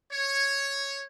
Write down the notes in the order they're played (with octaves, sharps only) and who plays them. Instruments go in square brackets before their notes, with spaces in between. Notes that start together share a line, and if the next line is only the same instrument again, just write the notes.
[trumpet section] C#5